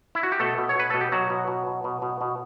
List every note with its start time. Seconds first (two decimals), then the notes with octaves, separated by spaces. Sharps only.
0.15 E4
0.23 F#4
0.32 G4
0.40 B2 A3 A4
0.58 B2
0.69 C#5
0.75 B2 B4
0.90 B2 A4
1.01 G4
1.12 B2 F#3 F#4
1.30 B2
1.48 B2
1.67 B2
1.84 B2
2.02 B2
2.21 B2